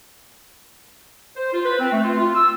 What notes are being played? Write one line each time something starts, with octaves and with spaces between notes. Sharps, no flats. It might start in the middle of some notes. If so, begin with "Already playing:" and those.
C5
F4
B4
C4
A3
F4
F4
E6